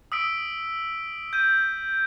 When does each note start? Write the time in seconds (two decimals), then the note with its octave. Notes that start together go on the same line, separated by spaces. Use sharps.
0.12 D#6 E6 B6 D7
1.33 G6 D#7